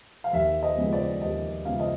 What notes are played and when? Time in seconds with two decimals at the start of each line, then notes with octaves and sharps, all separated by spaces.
0.24 F5
0.33 D#2 E5
0.63 D#5
0.77 C#3 F3 G#3 B3
0.93 D5
1.22 D#2 D#5
1.65 C#3 F3 G#3 B3 F5
1.73 E5
1.80 D#5